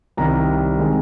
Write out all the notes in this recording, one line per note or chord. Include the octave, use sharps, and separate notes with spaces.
C2 C3 D#3 G3 A#5
D#3 G#3 C4 D#4